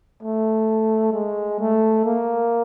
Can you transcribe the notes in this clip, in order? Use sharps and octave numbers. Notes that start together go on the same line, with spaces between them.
A3
G#3
A3
A#3